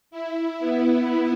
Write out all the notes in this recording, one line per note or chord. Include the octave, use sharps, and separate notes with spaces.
E4
B3